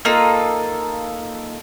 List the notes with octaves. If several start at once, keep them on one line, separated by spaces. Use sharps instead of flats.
A#3 D#4 F4 A4